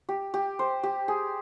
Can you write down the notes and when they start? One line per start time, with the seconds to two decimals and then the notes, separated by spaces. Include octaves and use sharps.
0.09 G4
0.34 G4
0.59 C5
0.83 G4
1.08 G#4